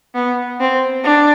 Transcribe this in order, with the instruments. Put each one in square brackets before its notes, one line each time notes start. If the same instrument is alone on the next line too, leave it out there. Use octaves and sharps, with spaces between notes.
[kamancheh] B3
C4
D4